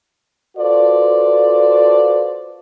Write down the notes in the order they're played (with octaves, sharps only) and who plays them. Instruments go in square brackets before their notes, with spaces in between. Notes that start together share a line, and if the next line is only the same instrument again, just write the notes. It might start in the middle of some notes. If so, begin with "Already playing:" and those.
[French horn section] F4 F#4 A4 B4 C5 D5